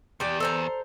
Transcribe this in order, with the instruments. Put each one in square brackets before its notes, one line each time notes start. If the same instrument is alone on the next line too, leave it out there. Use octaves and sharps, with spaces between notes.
[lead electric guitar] E2 [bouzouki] G4 D5
[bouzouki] A4 C5 A#5